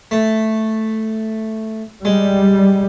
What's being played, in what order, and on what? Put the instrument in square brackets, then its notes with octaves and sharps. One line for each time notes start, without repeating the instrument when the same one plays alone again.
[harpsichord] A3
[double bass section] G3 [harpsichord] G#3